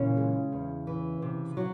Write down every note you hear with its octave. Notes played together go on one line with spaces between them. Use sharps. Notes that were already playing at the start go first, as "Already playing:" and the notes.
Already playing: A#2 C#3 E3 C#4
G#3
E2
E3
C3
F#3